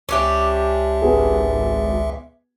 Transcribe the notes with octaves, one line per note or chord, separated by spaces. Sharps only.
C#2 C#4 D4 G4 E5
G#1 B3 G#4